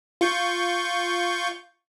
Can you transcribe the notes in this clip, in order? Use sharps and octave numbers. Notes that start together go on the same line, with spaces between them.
F4 C#6 G6